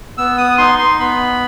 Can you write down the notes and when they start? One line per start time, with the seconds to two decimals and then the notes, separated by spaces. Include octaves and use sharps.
0.18 B3 E6
0.38 D#6
0.58 D#4 C6
0.78 C6
0.99 B3 B5